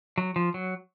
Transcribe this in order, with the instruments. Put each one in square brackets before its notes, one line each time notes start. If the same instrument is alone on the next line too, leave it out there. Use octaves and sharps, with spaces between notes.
[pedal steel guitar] F#3
F3
F#3